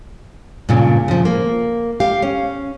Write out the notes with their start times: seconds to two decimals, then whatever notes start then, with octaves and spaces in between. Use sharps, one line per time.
0.69 G2 A#2 C#3
1.08 C#3 F3
1.25 A#3
2.00 G4 F5
2.22 C#4